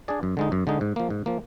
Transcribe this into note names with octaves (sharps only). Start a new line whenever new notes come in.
D4 G#4 D5
F#2
D3 G#3 D#4
F#2
D3 G#3 D#4
G#2
F3 A#3
G#2
F3 A#3